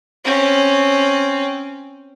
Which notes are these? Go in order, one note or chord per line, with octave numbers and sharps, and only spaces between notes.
C4 C#4